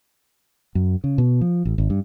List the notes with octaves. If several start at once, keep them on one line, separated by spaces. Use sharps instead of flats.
F#2
C#3
B2
F3
A1
G#1
G2